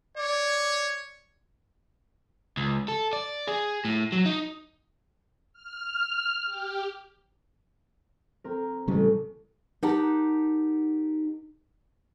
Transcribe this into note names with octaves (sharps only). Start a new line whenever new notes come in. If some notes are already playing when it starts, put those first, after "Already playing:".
C#5 D5
C#2
A4
D5
G#4
A2
F#3
D#4
F6
G4
C4 A#4
A1 C#3 G3 C#4
D#4 G4 A#4 F#5 A5